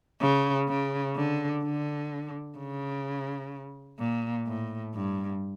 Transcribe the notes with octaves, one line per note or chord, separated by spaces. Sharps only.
C#3
C#3
D3
D3
C#3
A#2
A2
G2